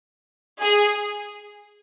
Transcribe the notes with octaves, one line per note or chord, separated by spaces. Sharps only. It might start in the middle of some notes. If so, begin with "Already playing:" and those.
G#4